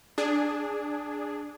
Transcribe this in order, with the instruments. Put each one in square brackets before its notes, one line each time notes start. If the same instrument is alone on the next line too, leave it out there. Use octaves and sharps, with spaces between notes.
[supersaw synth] D4 G#4